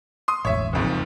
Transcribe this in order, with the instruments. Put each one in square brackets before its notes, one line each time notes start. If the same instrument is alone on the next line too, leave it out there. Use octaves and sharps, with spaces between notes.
[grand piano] C6 D#6
[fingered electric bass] E1 A1 [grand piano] C#5 E5
[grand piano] F#1 F2 G#2